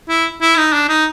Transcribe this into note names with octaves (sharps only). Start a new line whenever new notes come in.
E4
E4
D#4
D4
D#4